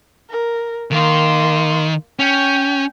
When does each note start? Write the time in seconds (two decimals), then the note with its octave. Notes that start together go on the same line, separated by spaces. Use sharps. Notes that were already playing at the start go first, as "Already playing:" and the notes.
0.30 A#4
0.91 D#3 A#3 C6
2.19 C#4 G5